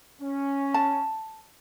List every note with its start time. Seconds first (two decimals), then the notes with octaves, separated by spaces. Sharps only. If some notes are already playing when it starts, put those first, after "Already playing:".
0.21 C#4
0.74 A5